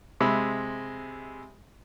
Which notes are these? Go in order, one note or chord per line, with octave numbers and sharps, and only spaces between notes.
C3 G#3 E5 B5